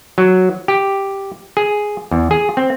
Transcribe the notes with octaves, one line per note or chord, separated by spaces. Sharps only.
F#3
G4
G#4
E2
G#4
C4